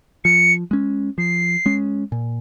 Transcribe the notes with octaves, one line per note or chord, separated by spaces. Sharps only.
F3 C#7
G#3 C#4
F3 C7
G#3 C#4
A#2